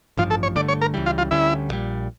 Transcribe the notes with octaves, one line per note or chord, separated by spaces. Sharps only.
A1 G2 F3 F4
A4
C#5
G1 G2 D3 A3 D5
C#5
A#4
C#2 C#3 E3 G3
F4
F4
D2 D3 G3 C#4 E4
A#1 A#2 G3